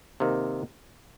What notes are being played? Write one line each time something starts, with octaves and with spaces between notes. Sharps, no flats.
C3 D#3 A#3